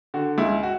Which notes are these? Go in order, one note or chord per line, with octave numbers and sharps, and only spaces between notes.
D3 F#4
C#2 E4
F#4